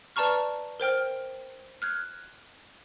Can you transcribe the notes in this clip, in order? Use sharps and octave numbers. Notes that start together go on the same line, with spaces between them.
B4 D5 A5 A#5 C#6 F6
A#4 C5 G5 F6
F6 F#6 G#6